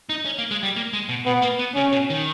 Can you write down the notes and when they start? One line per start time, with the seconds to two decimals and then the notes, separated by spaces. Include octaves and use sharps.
0.09 D#4
0.25 C#4
0.38 A#3
0.51 G#3
0.63 G3
0.76 A#3
0.93 G#3
1.09 B2
1.26 B2 B3
1.42 A#3
1.59 B3
1.76 C#3 C#4
1.92 B2
2.10 D#3